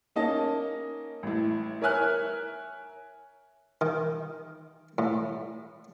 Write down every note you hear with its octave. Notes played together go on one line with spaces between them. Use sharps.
A#3 C#4 D#4 D#5 A5
A1 A2
A#4 C#5 E5 G#5 F6 F#6
D#3
A2